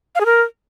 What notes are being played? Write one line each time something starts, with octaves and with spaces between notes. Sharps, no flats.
F5
G#4
A#4